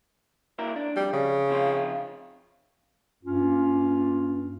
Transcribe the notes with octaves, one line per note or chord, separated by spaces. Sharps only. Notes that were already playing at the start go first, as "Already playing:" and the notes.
A#3 E4 A#4
D4
F2 G3
C#3
C3 F3 F4
G2 A#3 C#4 F4